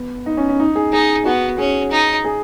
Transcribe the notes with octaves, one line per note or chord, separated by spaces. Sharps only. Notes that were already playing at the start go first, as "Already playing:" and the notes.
Already playing: B3
D#4
C#4
C#4
D#4
G#4
D#4 G#4
B3 F#4
C#4 G#4
D#4
G#4